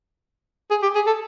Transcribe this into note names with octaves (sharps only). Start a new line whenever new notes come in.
G#4
G4
G#4
A4